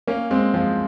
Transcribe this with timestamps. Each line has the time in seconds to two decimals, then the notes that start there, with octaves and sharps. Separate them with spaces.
0.07 A#3 C#4
0.31 G#3 C4
0.54 F3 G#3